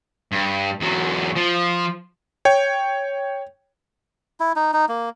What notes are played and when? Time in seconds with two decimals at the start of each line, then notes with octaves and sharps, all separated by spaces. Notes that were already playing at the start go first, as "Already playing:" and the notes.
0.32 G2
0.80 E2 F#3
1.36 F3
2.45 C#5 G5
4.40 E4
4.56 D#4
4.73 D#4
4.89 A#3